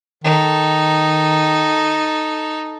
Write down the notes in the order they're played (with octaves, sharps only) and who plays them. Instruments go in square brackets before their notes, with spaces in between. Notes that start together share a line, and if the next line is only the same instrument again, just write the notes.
[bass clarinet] D#3 [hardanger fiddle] D#4 A4